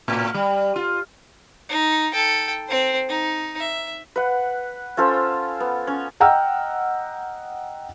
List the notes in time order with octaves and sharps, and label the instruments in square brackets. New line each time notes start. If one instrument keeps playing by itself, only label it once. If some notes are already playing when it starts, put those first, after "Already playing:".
[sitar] A2
G3
F4
[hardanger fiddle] D#4
A4 G5
C4 C5
D#4
E5
[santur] B4 F#5
C#4 F4 A4 C5
B3
C#4
[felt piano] D#5 F#5 G5 A#5 E6 F6